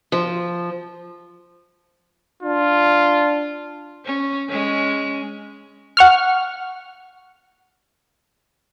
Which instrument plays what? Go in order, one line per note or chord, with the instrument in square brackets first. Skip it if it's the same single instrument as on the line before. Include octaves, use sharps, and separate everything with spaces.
[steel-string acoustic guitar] F3
[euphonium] D4 [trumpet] F4
[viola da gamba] C#4
G#3 C#4
[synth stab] F#5 C#6 F6